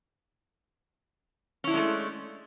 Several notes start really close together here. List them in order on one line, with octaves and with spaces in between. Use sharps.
C#4 E4 D4 G#3 A3